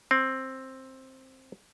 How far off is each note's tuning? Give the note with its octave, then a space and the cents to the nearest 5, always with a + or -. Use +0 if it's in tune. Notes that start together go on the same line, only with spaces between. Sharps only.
C4 +10